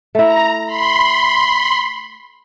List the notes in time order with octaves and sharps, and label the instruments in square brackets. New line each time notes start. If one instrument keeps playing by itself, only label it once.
[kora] A3 E4 [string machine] A#5
[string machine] B5 C6